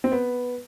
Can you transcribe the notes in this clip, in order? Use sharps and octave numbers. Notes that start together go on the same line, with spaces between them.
C4
B3